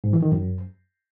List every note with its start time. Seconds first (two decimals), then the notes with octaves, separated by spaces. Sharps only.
0.04 G#2
0.13 E3
0.23 D#3
0.32 F#2